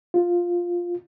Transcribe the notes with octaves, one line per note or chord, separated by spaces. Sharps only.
F4